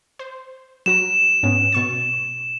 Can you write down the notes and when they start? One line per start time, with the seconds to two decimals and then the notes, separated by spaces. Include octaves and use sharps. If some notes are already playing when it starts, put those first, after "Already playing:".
0.19 C5
0.86 F#3 F#4 A#5 E7
1.43 G#2 B3 C#4
1.72 B2 C#6 A6